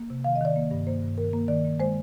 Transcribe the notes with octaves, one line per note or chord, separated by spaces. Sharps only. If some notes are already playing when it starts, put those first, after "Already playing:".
Already playing: A#3
C3
D#3 F5
D#5
D#3 D5
A#3
G2
A#3 C5
G2
D#3 A#4
A#3
D#3 D5
A#3
G#3 C5